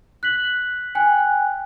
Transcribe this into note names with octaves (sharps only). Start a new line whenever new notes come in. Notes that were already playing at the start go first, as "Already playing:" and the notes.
F#6 B6 F#7
G5 G#5 F#6